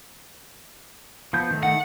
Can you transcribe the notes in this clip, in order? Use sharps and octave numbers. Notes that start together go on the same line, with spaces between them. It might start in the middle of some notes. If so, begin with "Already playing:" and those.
F3 B3 G6
D#3 A3
F#5